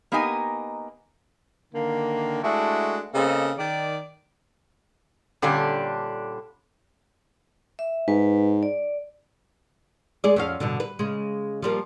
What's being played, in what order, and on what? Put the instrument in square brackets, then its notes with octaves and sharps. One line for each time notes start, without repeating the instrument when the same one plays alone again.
[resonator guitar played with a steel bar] A#3 B3 D#4 G4 D#5 G#5
[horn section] D3 D#3 A#3
G#3 A3 D4 E4 F#4
C#3 A#3 C4 A4 D#5
D#3 D5
[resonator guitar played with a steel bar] A#2 D3 G3 C#4 D4
[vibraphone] E5
[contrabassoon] G#2 [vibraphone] B4
[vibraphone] D5
[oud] G#3 G#4 D5
F2 C#4 F5
G2 B2 D3
B4
C#3 G#3
F3 G3 A#3